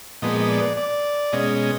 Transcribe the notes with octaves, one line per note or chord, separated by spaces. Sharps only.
A#2 F3 G#3 B3 D#5
D#5
D5
D5
B2 G#3 C#4 D#5